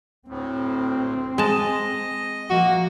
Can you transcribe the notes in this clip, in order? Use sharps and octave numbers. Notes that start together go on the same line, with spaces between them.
D2 A2 C4
G#3 D#5 A5
F3 A#3 F#4